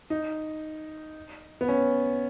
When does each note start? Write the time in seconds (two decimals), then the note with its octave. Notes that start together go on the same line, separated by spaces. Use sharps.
0.10 D#4
1.61 B3
1.68 C#4